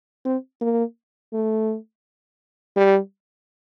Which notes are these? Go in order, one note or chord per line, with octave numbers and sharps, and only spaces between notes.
C4
A#3
A3
G3